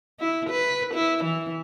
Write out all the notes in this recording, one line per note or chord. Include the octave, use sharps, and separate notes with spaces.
E4
B4
E4
E3